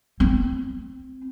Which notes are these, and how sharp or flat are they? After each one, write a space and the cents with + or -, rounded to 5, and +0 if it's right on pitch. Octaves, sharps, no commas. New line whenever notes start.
C4 -10